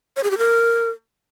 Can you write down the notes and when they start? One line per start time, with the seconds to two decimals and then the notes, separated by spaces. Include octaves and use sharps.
0.16 C#5
0.24 G#4
0.31 G4
0.38 A#4